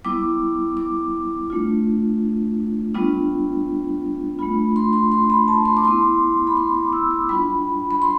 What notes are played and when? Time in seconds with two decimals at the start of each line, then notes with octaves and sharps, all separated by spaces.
0.05 G3 B3 E4 D6
0.77 D6
1.50 A3 D4 F4
2.94 G3 B3 D4 F4
4.39 A3 D4 F4 B5
4.76 C6
4.93 C6
5.12 C6
5.30 B5
5.48 A5
5.65 C6
5.77 D6
5.84 B3 E4 C6
6.47 B5
6.57 C6
6.75 D6
6.93 E6
7.11 D6
7.29 G3 D4 F4 B5
7.91 B5
8.02 C6